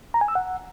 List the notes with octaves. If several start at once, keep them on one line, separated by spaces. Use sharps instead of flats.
A#5
G#5
E6
F#5